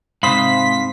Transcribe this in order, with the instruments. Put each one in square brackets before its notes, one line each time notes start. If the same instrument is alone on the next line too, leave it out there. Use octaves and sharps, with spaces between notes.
[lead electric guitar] G#2 [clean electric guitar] C3 C5 B5 [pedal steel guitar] F5 C6 D#6 [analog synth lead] B6